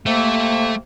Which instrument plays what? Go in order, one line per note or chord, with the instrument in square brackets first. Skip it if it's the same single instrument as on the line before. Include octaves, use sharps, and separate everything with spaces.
[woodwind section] C3 A#3 [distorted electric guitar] A3